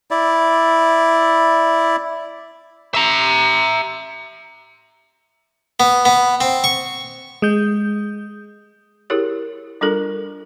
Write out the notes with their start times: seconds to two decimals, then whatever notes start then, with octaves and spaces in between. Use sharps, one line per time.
0.11 E4 D5
2.94 E5 A#5
5.80 B3
6.05 B3
6.41 C4
6.64 C#6
7.42 G#3 G6
9.10 E4 G4 G#4 A#4 C#5
9.81 G3 D4 F4 A4 A#4